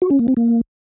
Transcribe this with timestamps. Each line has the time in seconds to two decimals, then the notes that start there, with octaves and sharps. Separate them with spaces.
0.02 F#4
0.11 C#4
0.19 A#3
0.28 C4
0.37 A#3